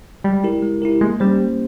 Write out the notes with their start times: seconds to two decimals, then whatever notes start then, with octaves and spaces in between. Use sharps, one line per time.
0.24 G3 G#3
0.44 E4 G4 A#4
0.62 G#3
0.82 E4 G4 A#4
1.01 G#3 A#3
1.20 G3 C#4 G4 C5
1.39 A#3